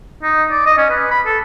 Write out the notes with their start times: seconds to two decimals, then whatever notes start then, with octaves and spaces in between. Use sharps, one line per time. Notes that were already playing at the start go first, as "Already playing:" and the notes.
0.23 D#4
0.51 D5
0.66 D#5
0.78 C#4
0.90 B4
1.11 B5
1.26 A4